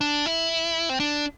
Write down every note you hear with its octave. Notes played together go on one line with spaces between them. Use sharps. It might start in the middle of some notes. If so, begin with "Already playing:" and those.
D4
E4
C4
D4